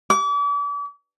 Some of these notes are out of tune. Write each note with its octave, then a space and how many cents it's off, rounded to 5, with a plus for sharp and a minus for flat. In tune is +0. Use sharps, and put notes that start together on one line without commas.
D6 -40